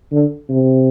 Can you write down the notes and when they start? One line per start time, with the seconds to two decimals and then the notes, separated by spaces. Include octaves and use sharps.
0.12 D3
0.49 C3